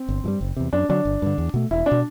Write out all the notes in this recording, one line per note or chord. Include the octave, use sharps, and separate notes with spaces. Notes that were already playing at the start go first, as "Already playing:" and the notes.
Already playing: C4
G1
G2 E3 G3
F#1
E2 C3
F#2 D4
D3 F#3 D4
G1
G2 D3
E2
B2 A3
E1 E4
D4
B2